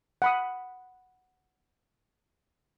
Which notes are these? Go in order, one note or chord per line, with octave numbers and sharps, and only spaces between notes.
F#5 B5 D#6